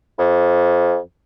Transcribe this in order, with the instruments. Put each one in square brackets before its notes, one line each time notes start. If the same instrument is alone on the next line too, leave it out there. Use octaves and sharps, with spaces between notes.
[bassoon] F2